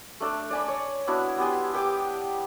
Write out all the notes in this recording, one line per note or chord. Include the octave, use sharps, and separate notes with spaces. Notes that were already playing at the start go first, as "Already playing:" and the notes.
A3 D4 A4 D5
D5 G#5 B5
C#5
B3 D4 E4 F#4
B3 G4 G#5 C6
G4 B4 G5 D6